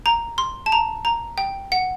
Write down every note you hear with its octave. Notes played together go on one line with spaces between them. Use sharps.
A#5
C6
A5
A#5
A#5
G5
F#5